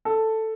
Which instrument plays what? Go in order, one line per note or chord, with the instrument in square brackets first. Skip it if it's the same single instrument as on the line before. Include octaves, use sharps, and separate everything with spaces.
[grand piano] A4